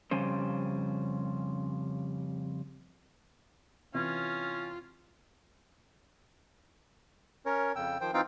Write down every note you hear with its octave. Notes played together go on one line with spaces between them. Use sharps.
F2 C#3 G3 C#4 C5
C3 E3 C#4 F4
C#4 A#4 C#5
F2 C#3 G5 E6
D#3 F3 C5 G5
E3 C4 D#4 F4 F5 G5